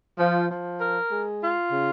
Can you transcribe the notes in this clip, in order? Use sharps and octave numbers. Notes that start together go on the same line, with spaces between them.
F3
F3
A#4
G#3
F4
C#3